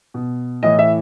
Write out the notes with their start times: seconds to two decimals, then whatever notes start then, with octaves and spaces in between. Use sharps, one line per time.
0.14 B2
0.63 A2 E3 D#5
0.79 E5